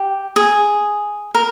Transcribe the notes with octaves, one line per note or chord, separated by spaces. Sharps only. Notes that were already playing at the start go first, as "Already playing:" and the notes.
Already playing: G4
G#4
A#4